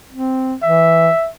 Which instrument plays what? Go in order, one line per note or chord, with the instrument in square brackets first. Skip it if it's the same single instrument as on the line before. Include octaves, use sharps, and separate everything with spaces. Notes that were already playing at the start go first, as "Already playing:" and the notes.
[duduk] C4
[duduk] E3 [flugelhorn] E5